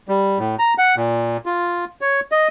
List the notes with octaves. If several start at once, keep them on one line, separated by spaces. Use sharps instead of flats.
G3
A2
A#5
F#5
A#2
F4
C#5
D#5